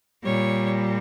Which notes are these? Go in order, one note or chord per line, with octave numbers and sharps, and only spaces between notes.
A#2 G3 C#5